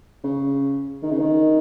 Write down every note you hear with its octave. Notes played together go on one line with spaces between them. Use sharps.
C#3
D#3
C#3
D#3